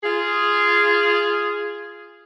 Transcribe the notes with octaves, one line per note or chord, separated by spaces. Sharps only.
F4 G#4